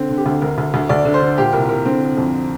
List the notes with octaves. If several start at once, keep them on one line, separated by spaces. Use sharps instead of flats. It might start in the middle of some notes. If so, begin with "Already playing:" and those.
Already playing: D3 C4
D3
G4
D2
D2 A#4
D2
D2
D2 D5
D3
C5
D3
A#2 G4
C2 A#4
C2 A#4
D3 C4
D3
F2